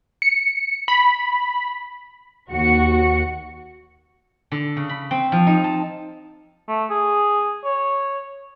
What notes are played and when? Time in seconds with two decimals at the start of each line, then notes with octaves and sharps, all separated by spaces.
0.22 C#7
0.88 B5
2.50 D#2 F#4 C#7
4.52 D3
4.77 C#3
4.89 B5
5.11 C4
5.32 F3
5.47 D#4
5.64 A5
6.68 A3
6.90 G#4
7.64 C#5